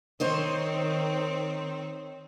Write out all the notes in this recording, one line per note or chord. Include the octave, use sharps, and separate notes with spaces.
D#3 C4 C5 C#5 D#5